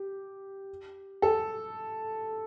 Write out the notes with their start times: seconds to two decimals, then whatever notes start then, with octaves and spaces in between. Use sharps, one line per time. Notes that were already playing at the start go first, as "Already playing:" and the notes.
Already playing: G4
1.22 A4